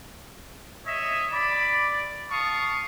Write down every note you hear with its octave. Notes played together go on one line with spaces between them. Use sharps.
C#5 D#5 E5
D5 B5
F5 A5 C#6 D#6